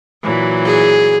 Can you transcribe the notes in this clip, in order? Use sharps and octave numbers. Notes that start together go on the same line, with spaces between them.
A#2 E3 F#3
G#4